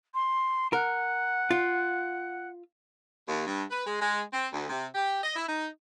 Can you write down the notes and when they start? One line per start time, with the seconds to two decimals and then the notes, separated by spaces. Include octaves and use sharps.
0.14 C6
0.73 A#4 F#5
1.51 F4
3.29 D#2
3.47 G2
3.71 B4
3.86 G#3
4.01 G#3
4.34 C4
4.53 D2
4.70 C3
4.95 G4
5.24 D#5
5.36 E4
5.49 D#4